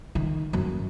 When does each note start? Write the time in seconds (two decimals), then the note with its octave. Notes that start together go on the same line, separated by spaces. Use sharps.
0.15 D#3
0.53 F#2